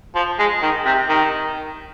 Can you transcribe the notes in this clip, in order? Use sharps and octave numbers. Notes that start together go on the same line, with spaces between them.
F3
G#3
D#3
C3
D#3